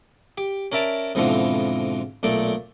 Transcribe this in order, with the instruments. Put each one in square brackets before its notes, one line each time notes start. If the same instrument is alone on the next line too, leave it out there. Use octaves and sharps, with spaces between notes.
[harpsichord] G4
C#4 A#4 D5 E5 A5 A#5
F2 G#2 B2 D3 E3 F3
B1 A#2 A3 D5